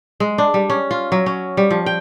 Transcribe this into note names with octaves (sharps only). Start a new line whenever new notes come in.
G#3
D4
G3
C#4
F4
F#3
C#4
G3
F3
G5